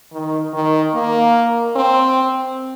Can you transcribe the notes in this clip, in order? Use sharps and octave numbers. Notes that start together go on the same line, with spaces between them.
D#3
D#3
A#3
C4